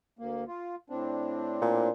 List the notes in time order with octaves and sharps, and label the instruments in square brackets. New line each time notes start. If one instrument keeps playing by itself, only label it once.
[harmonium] D2 A#3
F4
A2 C4 D4
[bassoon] A#2